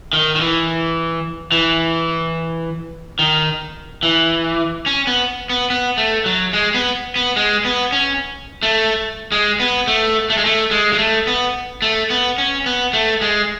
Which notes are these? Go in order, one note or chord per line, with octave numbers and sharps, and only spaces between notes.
D#3
D#3
E3
E3
D#3
E3
C#4
B3
B3
B3
A3
F#3
G#3
B3
B3
G#3
B3
C#4
A3
G#3
B3
A3
A3
G#3
A3
G#3
G#3
A3
B3
A3
B3
C#4
B3
A3
G#3